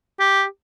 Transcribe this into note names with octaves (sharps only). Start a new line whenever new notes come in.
G4